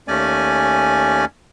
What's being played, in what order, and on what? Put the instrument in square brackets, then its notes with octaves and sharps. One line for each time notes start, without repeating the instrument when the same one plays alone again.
[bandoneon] D#2 A3 C#4 D5 G#5